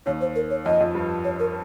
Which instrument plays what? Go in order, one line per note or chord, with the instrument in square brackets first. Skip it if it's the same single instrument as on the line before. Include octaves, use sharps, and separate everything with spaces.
[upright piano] D#2 D#3 [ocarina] C#5
[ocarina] C5
A#4
C#5
[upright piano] F2 F3 [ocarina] D#5
[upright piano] F2 F3
G2 G3
[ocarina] C#5
A#4